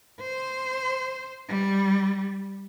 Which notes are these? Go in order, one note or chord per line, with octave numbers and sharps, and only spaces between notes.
C5
G3